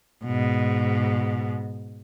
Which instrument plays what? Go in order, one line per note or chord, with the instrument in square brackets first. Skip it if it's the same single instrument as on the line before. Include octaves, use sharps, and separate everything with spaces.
[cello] G#2 B2